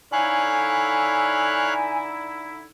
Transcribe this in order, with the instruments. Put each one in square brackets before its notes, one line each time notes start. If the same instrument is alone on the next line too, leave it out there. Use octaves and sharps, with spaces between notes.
[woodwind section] D3 D#4 E4 [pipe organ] C#5 F5 F#6 [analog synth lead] G#5